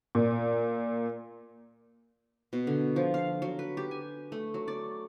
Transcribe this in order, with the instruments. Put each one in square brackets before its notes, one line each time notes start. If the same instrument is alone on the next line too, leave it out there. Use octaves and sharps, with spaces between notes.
[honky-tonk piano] A#2
[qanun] B2
D3
F3
F5
F#3
B4
G4
G#5
A3
F#3
D5